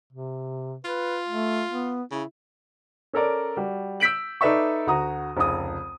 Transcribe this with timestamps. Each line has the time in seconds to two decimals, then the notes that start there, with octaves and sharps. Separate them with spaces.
0.13 C3
0.85 F4 B4
1.28 A3
1.69 B3
2.11 C#3 E4
3.13 C#4 A4 A#4 D5
3.56 G3 F#4
4.00 E6 G6 B6 D7 F#7
4.41 D#4 A4 B4 D5 E5 C#6
4.87 D2 F#4 A#5 D#6
5.37 F1 C#2 D#6